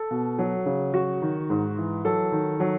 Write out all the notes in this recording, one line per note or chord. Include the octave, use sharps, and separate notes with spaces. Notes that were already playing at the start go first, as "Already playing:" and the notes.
Already playing: A4
B2
F#3
C#3
F#3 F#4
D#3
G#2
E3
F#3 A4
D#3
F#3